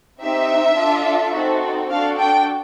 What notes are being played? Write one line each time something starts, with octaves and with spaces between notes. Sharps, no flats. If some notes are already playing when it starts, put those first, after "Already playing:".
C4 D#4 G4 E5
D4 F4 A4
C4 D#4 F#4 A4
D4 F#4 A4 F5
G5